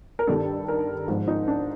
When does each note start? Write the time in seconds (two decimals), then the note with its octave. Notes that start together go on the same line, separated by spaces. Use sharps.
0.19 A#4
0.27 G2 D#3 G3 A4
0.68 A#4
1.08 G#2 F3
1.28 D#4
1.48 D4